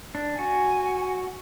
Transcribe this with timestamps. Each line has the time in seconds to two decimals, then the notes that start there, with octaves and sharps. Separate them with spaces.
0.15 D4
0.38 F#4 G#5